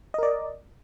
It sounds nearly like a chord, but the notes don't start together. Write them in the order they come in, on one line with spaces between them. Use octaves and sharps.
D#5 A#4 D5